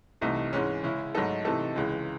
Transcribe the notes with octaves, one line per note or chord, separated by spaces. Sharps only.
C2 C3 E3 A3 D#4
G#2 E3 G#3 C#4
C#3 G#3 C#4 E4
G#2 F#3 A3 D#4 A4
C3 E3 A3 D#4 A4
C#2 C#3 E3 G#3